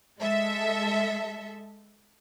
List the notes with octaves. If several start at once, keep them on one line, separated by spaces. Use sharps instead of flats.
G#3 A4 E5